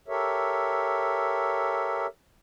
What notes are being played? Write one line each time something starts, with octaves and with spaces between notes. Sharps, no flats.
G4 A4 A#4 C#5 E5